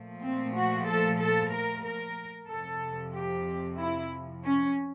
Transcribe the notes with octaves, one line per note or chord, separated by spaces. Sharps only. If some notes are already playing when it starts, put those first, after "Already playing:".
Already playing: A#2 F3 A3
C4
F#4
A4
A4
A#4
A#4
F2 C3 F3 A4
G4
E4
C#4